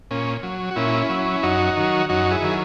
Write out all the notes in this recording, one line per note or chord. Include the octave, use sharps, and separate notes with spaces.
A#2 C#4
F#3
F#4
A#2 C#4 E4
F#3
F#2 D#4 F#4
D#3 F#3
F#2 D#4 F#4
E4 G#4
D#3 F#3